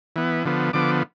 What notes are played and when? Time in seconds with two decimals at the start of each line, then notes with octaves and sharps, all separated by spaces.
0.16 E3 B3
0.45 D3 F3 B3
0.73 D3 F3 B3 D6